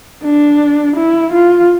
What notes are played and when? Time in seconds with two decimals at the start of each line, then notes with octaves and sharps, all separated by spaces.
0.24 D4
0.96 E4
1.32 F4